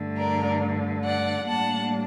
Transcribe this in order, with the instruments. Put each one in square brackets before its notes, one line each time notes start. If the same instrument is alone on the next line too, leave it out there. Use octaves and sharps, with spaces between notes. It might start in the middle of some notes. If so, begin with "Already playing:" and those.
Already playing: [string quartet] G2 D3 A3
A#4 D5
D5 F#5
A2 G3 A#3 D4 F#5 A5